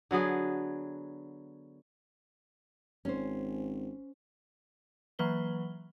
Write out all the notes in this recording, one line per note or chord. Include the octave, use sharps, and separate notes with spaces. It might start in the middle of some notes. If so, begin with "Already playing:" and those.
D3 F#3 B3 G#4
G#1 C#4 C5
E3 F#3 A#3 B4 G7